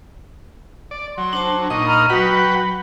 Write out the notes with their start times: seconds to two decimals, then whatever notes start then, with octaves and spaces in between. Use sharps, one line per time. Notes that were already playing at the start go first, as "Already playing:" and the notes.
0.91 D5
1.18 F#3 C6
1.33 D4 C5 A5
1.70 A#2 D#4 D#5 C#6
1.86 A#5 B5 F6
2.10 F#3 F#4 B4 F#5 G5 B5